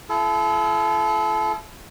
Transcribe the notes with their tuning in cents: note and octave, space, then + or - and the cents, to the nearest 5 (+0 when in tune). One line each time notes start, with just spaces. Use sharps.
E4 +40 A4 -35